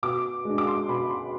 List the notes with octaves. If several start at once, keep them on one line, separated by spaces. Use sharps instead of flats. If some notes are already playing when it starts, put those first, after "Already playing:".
B2 D6
G#3 D4
D6
C6
B2 B5
C6